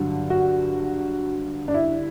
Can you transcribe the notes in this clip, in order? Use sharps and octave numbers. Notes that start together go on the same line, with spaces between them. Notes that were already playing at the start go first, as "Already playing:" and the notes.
Already playing: G2 D3 F#3
F#4
D4
E4